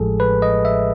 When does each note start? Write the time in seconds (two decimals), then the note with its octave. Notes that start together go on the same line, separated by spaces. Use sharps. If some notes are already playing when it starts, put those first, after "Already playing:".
Already playing: A1 A2 F3 G#3 G#4 A4
0.20 B4
0.42 D#5
0.65 E5